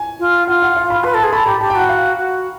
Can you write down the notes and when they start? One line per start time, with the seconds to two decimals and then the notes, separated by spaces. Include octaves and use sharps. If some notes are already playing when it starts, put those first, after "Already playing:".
Already playing: G#5
0.20 F4
0.47 F4 F#5
0.62 F#5
0.77 F5
0.90 B5
1.04 B4 C6
1.14 A4 C6
1.23 G#4
1.33 A4 B5
1.46 G4 A#5
1.61 G4 A5
1.70 G5
1.75 F#4 F#5
1.89 F5
2.17 F#4